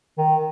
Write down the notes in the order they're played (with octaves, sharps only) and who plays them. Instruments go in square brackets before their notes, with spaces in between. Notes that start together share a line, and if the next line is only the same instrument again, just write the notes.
[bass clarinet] D#3